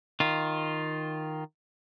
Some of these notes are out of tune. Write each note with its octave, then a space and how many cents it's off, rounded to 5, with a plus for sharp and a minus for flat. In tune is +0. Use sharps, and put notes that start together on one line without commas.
D#3 +0 F4 +0